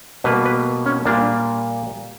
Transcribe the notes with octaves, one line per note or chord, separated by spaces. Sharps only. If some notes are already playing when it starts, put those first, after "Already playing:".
B2 G3 A#3 B4
B4
C#4
A#2 G3 A#3 D4